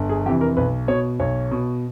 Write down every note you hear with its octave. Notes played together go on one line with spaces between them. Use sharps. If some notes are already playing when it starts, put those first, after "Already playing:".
Already playing: G1
G#4
F2 C3 E3 G4
A#4
B1 B4
B2 C#5
B1 C#5
B2